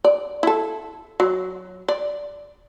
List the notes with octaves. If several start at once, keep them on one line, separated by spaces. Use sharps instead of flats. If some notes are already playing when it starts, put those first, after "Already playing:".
D5
E4 A4
F#3
D5